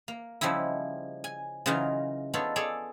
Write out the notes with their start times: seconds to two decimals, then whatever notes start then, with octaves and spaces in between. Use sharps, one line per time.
0.08 A#3
0.41 C#3 F3 G3 D#4 E4
1.24 G#5
1.66 C#3 E3 F#3 D#4 F4 A#4
2.34 B3 D4 D#4 F4 A4 C#5
2.56 G#4 A4 C#5 D5